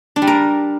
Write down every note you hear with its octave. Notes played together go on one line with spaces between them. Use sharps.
D4
G3
A#4